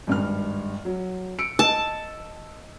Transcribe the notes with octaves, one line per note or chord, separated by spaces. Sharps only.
G#1 G2 F6
F#3
E6 C#7 D7
D#5 A5 E6